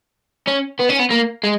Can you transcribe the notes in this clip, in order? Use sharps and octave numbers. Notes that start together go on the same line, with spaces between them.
C#4
B3
C#4
B3
A#3
G#3